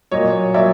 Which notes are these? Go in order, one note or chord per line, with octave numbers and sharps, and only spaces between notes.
A#2 F#3 C#5 D#5
A#2 F#3 D5 E5